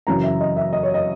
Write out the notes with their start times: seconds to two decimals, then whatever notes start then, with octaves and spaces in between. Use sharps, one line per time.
0.07 F#2 C#3 E3 A#5
0.24 E5
0.40 D#5
0.57 E5
0.73 D#5
0.83 C#5
0.94 D#5